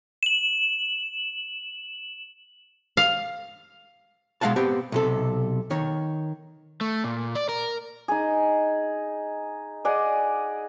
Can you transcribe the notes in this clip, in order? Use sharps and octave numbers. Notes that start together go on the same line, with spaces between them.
E7 F#7
F5
B2 G#3 C#4 F5 F#5 A5
B3 C4 G4
B1 C3 A4
D#3 C#5
A3
A#2
D5
A#4
D#4 G#4
G#4 D5 D#5 F#5